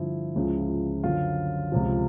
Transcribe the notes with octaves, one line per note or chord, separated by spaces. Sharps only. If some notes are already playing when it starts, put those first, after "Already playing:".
Already playing: G2 D3 F3 E4
C#2 C#3 F3
F#2 D3 F3 F4
C#2 C3 F3